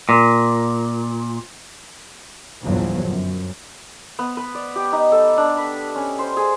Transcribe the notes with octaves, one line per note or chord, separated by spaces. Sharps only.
A#2
G1 E2 A#2 F3 F#3
F#2
B3
B4
D5
G4
D#4
A4
D4
B5
C#4
C5
G#4